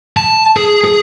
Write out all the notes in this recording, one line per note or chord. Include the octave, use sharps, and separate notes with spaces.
A5
G#4
G#4